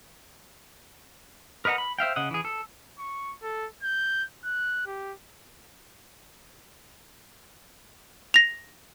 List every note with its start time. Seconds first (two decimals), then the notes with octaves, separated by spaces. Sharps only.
1.65 A#4 B4 D#5 F#5 A#5
1.78 B5
1.99 C5 E5 F5 G5
2.16 C#3 D#5 F#5
2.31 E3 G#4
2.45 A4
2.99 C#6
3.42 A4
3.83 G6
4.45 F#6
4.87 G4
8.34 A#6 F7